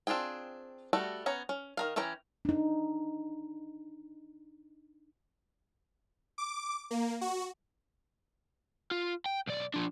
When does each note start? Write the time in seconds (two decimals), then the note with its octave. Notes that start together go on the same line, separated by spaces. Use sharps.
0.07 C4 D4 F4 G#4 G5
0.93 G3 A3 F#4 A4
1.26 B3 C#4 C#5 A#5
1.49 C#4
1.77 D#3 A#4 F5
1.96 E3 C#4 C#5 G5 A#5
2.45 D4 D#4
6.38 D6
6.91 A#3
7.21 F#4
8.91 F4
9.26 G5
9.47 B1 D5
9.74 F3 D4